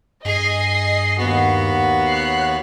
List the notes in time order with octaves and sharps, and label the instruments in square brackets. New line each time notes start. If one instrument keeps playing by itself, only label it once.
[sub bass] G2 [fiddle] G#4 [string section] D#5 C7
[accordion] D#2 F#4 [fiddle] B3
[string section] C#5 F#6 C7